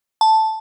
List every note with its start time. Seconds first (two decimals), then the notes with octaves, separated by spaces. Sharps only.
0.21 A5